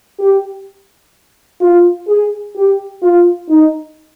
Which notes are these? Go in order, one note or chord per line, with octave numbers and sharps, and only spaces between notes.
G4
F4
G#4
G4
F4
D#4